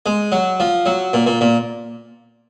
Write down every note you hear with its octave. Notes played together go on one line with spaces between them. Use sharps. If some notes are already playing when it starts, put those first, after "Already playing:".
G#3
F#3
F3
F#3
A#2
A#2
A#2